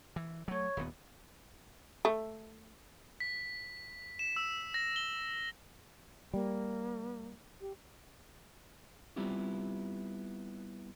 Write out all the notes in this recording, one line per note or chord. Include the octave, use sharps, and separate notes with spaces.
E3
F#3 A3 C#5
D#1 D#2 B3
A3
B6
E7
E6
A#6
G7
G3 A#3
G4
G3 B3 C4 E4 F4 G4